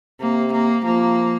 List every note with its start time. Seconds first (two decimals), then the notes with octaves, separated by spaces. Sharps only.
0.20 C3 A#3
0.52 A#3
0.84 F3 A#3